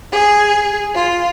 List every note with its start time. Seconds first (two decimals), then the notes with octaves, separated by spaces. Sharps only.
0.11 G#4
0.94 F4